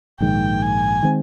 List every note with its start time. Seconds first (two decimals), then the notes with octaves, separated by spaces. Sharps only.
0.20 A#1 G#2 D#3 G#3 G5
0.62 G#5
1.03 D#3 G#3 C4